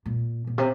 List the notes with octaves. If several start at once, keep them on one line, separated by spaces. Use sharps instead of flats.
A#2
A#2
C3